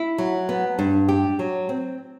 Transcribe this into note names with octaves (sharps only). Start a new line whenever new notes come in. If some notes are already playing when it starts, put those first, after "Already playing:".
Already playing: E4
F#3
B3
G2
G4
F#3
C4